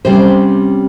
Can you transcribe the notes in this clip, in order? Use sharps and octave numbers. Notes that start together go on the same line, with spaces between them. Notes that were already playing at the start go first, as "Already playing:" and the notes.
C3 G3 C#4 C5